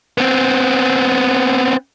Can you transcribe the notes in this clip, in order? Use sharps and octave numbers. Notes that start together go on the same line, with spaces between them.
B3 C4